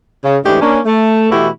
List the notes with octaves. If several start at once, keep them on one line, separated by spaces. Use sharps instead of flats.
C#3
G#2 E3 A3 D4 D#4 G4
A#3 C#4 D4
A3
B2 E3 A3 E4 F#4 G4